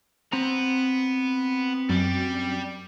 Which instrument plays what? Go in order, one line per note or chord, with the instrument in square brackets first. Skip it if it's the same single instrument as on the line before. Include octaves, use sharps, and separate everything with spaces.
[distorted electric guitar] B3 [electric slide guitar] C4 A#5
[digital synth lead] F#2 [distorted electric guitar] G3